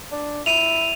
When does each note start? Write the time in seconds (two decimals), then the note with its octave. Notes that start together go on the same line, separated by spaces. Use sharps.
0.12 D4
0.46 E4 D#7 F7